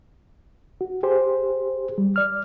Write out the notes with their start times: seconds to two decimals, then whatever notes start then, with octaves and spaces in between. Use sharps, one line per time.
0.81 F#4
1.03 G4 G#4 C5
1.98 G3
2.16 D5 F6